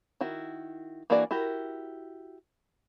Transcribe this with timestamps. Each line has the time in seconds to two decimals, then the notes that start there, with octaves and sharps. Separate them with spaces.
0.21 D#3 E4 F#4
1.10 E3 A#3 D4 F#4 D5
1.31 E4 F#4 G4 A#4